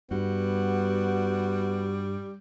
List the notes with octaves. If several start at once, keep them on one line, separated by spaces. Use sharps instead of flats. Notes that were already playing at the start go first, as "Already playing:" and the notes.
G2 G3 B3 F#4